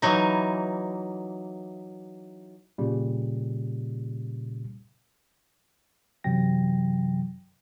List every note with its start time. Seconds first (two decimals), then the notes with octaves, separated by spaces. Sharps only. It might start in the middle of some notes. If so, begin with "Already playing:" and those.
0.02 E3 F#3 D#4
2.78 A#2 C#3 G3
6.24 F#2 C3 E3 F#3 G5 A#6